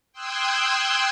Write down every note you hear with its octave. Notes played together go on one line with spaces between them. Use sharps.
G5 C6 D#6 E6 F#6 G#6